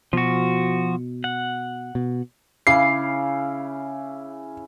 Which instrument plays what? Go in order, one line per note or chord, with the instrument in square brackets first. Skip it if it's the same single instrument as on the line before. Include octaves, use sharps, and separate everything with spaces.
[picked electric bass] B2 [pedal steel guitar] F3 F#4
[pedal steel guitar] F#5
[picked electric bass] B2
[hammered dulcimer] C#3 E4 D6 [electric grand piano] C7